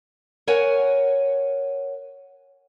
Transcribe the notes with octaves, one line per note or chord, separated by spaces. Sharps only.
A#4 C#5 F#5 G#5